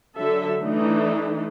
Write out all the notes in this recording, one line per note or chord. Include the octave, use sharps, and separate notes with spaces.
D3 F#3 A4 E5
E3 A3 D4 D#4